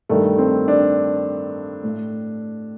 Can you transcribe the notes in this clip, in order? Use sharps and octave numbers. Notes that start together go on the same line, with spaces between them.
G2 D#3 A3
C4
D4
A2